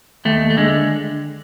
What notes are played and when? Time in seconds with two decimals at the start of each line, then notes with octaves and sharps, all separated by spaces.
0.25 D#2 A3
0.50 A3
0.57 D3 G#3